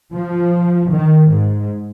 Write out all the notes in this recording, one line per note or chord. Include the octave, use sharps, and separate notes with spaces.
F3
D#3
G#2